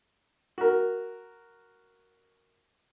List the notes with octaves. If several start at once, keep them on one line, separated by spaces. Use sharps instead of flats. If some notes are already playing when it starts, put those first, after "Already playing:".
F#4 A#4